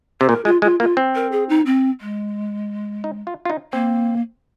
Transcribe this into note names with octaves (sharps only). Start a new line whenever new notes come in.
C3 C5
A#2 A#4
G#3 F4
G#3 F4
A#3 F4
C4
A#4
G#4
D#4
C4
G#3
D#4
F4
F4
D#4
A#3 C4